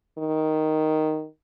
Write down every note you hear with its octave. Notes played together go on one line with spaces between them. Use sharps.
D#3